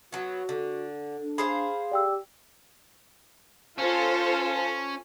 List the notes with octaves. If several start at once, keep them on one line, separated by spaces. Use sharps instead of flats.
F#3 B3 F#4
D3
D4
G#4 C5 F5 B5
G4 D5 G5 E6
C#4 F4 A4 C5